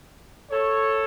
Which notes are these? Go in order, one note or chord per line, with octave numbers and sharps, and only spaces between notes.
A4 C#5